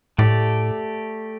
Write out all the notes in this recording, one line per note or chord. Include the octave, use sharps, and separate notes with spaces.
A2 A3 G4 D5